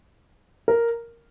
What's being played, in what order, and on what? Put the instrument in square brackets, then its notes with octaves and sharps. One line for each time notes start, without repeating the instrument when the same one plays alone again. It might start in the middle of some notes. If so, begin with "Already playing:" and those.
[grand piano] A#4